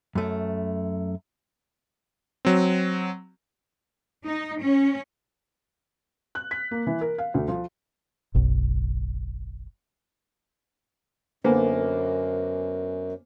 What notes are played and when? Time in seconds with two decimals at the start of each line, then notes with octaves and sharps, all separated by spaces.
0.15 F#2 A3
2.45 F#3 C4
4.25 D#4
4.59 C#4
6.35 F#6
6.51 B6
6.71 A#3
6.87 E3
7.01 A#4
7.18 F5
7.34 D2
7.48 F3
8.35 F#1 B1
11.44 F#2 D3 A#3 B3 C5 G#5